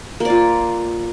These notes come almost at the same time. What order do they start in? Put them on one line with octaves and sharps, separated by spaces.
A#3 D5 F4